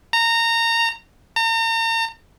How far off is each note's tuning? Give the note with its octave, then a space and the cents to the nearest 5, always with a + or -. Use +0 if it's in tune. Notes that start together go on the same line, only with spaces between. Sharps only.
A#5 -20
A#5 -40